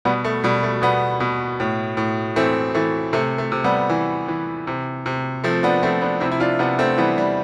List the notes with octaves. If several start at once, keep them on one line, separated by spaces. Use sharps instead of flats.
B2 G3 B3
A3
B2 G3
A3
B2 G3 B3
B2
A2
A2
E3 A3 C4
E3 A3
C3 A3
A3
C3
G3 B3
E3
E3
C3
C3
F3 A3 C4
B3 D4
F3 A3 C4
B3 D4
C3 C4 E4
E4
D4 F4
C3 B3 D4
A3 C4
E3 G3 B3
G3